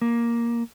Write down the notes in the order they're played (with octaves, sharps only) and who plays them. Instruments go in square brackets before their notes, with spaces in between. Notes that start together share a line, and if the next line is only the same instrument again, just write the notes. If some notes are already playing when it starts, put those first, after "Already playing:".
[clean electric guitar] A#3